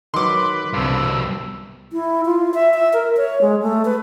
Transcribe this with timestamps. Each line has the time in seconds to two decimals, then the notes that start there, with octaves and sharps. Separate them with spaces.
0.14 D#3 F#3 B4 C6 D6
0.73 C2 G2 B2 F5 E6
1.93 E4
2.25 F4
2.54 E5
2.74 E5
2.94 A#4
3.17 C#5
3.42 G#3
3.63 A3
3.85 B4